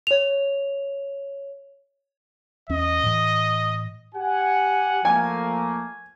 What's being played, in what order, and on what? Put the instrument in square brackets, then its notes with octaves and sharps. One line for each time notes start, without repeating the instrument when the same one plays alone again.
[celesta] C#5 F7
[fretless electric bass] E2 C#4 [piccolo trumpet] D#5
[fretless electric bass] A2 E3
[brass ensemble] G4 F#5 G#5
[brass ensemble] F3 A3 A#3 [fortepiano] G#5